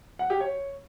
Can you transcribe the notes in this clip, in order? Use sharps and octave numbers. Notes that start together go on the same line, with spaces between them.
F#5
G4
C#5